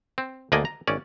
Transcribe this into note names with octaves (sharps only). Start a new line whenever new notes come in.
C4
D2 D3 A#3 D5 D#5 G#5
A#5
G#1 C#4 D5